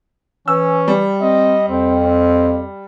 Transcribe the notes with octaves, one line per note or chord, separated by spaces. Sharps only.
E3 C#4 E6
G3
C4 D#5
F2 C4
C4